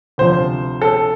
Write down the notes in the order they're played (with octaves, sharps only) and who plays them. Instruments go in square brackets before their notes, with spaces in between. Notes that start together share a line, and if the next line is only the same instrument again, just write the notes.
[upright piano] D2 C3 F3 C5
A4